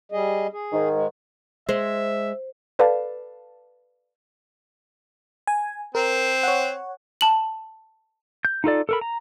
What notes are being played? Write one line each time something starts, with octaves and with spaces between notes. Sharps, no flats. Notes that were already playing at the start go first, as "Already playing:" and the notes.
G3 G#4 D#5
G#4
G#2 D#3
G#3
G#3 C5 E5
A4 B4 D5 F5 A5
G#5
C4 A#4
C#5 F#5
A5 F#7
G6
D#4 F4 A4 D5
A4 A#4 B5
A#5